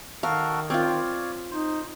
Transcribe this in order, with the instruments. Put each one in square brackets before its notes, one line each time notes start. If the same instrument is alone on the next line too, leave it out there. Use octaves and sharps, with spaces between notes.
[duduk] D#3 [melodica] F#4 A4 A#4 [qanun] F5
[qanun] C4 F4 [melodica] C#5 D5 F5
[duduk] D#4 [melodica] C5